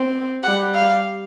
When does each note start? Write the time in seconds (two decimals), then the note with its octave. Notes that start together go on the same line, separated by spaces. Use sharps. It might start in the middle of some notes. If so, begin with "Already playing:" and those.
Already playing: C4
0.43 G3 F#5
0.74 F5